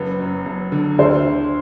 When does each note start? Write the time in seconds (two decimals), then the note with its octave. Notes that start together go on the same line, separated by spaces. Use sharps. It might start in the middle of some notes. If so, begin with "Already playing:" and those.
Already playing: F#1 B4
0.19 F#2
0.45 F#1
0.72 D3
0.98 D2 C5
1.25 D3